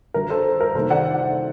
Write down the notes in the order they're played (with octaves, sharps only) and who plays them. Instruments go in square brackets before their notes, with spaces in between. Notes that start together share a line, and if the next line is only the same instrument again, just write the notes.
[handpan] D3 G3 D4 F#4 [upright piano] A#4
[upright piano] A4 C5
A#4
[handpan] C3 D#3 G3 A#3 D#4 [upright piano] A4 C5
[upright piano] D5 F#5